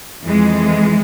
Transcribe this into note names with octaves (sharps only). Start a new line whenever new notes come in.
F2 E3 G#3